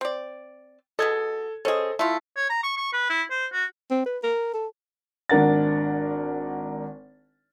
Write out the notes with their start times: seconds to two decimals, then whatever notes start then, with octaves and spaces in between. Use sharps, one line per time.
0.01 C4 D5
0.99 B2 G#4 A4 D#5 G#6
1.65 C#4 G#4 A4 C5 D#5
1.99 A3 E4 F4
2.36 C#5
2.50 A#5
2.63 C#6
2.77 C#6
2.93 B4
3.10 E4
3.31 C5
3.53 F#4
3.91 C4
4.06 B4
4.23 A#4
4.54 A4
5.29 G#1 D4 A#4 F#5 A6